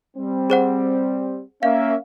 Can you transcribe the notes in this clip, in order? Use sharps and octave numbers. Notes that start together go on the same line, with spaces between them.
G3 C4
G#4 C5 F#5
A#3 C#4 E5 F5